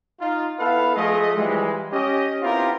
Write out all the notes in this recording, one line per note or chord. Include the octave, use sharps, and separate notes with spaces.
D#4 F4
B3 E4 A4 B4 F5
F3 G#3 A3 G#4 D#5
E3 F3 G3 G#3
C#4 G4 D#5
B3 C4 E4 F4 G4 A#4